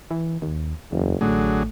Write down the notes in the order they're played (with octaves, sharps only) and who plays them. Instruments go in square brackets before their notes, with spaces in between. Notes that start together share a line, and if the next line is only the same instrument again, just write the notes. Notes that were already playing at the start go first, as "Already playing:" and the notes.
[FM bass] E3
D#2
[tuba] F#1 [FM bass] E2
[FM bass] A1 [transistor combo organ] D3 F#3 G#4 [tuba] A3